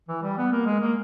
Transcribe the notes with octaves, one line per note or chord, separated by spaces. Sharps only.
E3
G3
B3
A#3
G#3
A#3